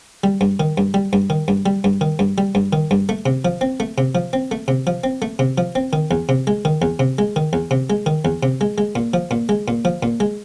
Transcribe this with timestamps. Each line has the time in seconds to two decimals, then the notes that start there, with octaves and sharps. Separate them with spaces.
0.24 G3
0.41 G2
0.60 D#3
0.78 G2
0.94 G3
1.13 G2
1.30 D#3
1.48 G2
1.66 G3
1.84 G2
2.01 D#3
2.19 G2
2.38 G3
2.55 G2
2.73 D#3
2.91 G2
3.09 A3
3.26 C3
3.45 F3
3.61 C4
3.80 A3
3.98 C3
4.15 F3
4.33 C4
4.51 A3
4.68 C3
4.87 F3
5.04 C4
5.22 A3
5.39 C3
5.58 F3
5.75 C4
5.93 D#3
6.11 E2
6.29 C3
6.47 G#3
6.65 D#3
6.82 E2
6.99 C3
7.18 G#3
7.36 D#3
7.53 E2
7.71 C3
7.90 G#3
8.06 D#3
8.25 E2
8.43 C3
8.61 G#3
8.78 G#3
8.95 A#2
9.14 F3
9.31 A#2
9.49 G#3
9.68 A#2
9.85 F3
10.03 A#2
10.20 G#3